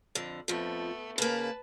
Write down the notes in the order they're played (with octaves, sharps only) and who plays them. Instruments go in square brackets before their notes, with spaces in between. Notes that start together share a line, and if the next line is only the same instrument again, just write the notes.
[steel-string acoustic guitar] F2 D3
[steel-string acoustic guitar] F2 F3 [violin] A3 B3
[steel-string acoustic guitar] C#3 A#3 [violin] B4 A5